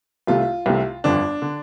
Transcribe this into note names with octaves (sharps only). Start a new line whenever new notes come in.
C2 C3 A3 F4
C2 C3 A3
G1 F2 D3 D4
D3